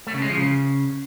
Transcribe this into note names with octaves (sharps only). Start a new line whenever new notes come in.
A3
C#3
G#3
F3
C#3